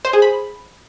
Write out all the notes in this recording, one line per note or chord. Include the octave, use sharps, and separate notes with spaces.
C5
G#4
B5